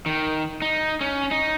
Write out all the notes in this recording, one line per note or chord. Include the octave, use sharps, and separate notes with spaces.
D#3
D#4
C#4
D#4